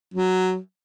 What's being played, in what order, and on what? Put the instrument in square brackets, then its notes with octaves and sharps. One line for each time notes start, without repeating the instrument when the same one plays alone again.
[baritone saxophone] F#3